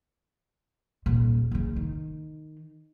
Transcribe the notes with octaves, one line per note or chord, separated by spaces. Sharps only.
D#1 A#2
F#1 C#3
D#3